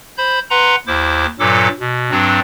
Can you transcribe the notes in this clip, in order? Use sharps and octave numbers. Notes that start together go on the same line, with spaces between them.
C5 B5 G6
B4 F#5 A#5 C6
D#2 E4 C5 D6
G2 A#2 F#3 A4 D6
B2
G2 F#3 C4 D4